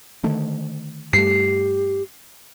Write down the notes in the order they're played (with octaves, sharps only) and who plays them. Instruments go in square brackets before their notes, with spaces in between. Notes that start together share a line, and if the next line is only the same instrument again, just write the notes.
[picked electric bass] D3 D#3 A3
[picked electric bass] G2 G3 A3 [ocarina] G4 [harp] C7